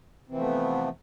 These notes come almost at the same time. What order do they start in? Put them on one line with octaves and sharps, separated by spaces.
C3 E3 F3 A3 B3